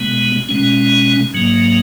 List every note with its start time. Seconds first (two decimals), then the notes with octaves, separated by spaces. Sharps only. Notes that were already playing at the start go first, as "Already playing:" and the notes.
Already playing: B2 G#3 B3
0.49 B2 G#3 C#4
1.34 G#2 F#3 A#3